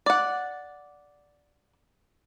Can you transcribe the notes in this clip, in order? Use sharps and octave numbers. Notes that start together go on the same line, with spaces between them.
D5 F#5